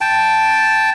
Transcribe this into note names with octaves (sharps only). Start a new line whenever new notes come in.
G5 A5